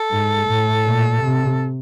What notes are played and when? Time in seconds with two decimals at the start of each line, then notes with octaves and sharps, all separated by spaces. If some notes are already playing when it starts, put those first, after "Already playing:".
Already playing: A4
0.11 G#2
0.47 A2
0.84 A#2
1.21 C3